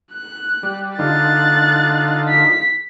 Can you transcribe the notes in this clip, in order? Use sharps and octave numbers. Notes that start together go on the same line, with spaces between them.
F#6
G3
D3 D#4 F4 F#6 A6
B6